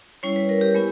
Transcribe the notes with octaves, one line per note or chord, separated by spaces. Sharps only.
G3 C#4 E4 C#5
B4
A#4
G4
G#3 B3 E4